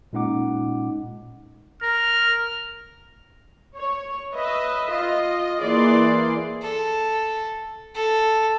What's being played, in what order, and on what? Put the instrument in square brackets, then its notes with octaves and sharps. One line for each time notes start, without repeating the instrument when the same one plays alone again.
[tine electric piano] A#2 G#3 C#4 D#4 F#5 D6
[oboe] A#4 [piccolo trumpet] F6
[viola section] C#5
B4 D#5 E5
F4 D#5
E3 A#3 G#4 D5 C6
[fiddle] A4
A4